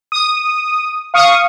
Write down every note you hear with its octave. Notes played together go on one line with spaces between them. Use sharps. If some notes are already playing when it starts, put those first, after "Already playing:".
D#6
F5 C#6 D#6